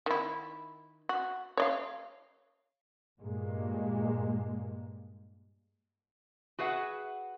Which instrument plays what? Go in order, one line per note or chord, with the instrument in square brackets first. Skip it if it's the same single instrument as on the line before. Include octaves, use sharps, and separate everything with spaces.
[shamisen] D#3 E4
F#4
C#5 D5 F5
[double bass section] G2 A#2 G#3 A#3
[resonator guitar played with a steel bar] F#4 G#4 B4 E5 F#5